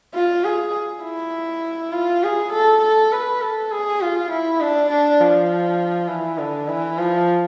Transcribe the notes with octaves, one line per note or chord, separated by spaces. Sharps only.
F4
G#4
E4
F4
G#4
A4
A4
B4
A4
G#4
F4
E4
D4
D4
F3
E3
D3
E3
F3